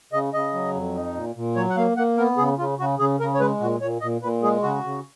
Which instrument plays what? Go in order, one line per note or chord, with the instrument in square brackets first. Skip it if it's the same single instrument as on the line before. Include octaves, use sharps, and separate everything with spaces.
[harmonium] C#3 D#5
C#3 D#5
F#3
F2
D#4
A#2
A#2
F#3 C#5
F#5
A#3 F5
A#3 F#5
B3 A#4
C#3 G#4
C#3 F4
C#3 F#4
C#3 G#4
C#3 A#4
C#5
G#3 B4
A#2 F#4
A#2 C#5
A#2 D#5
A#2 B4
G#3 G#4
C#3 F#4
C#3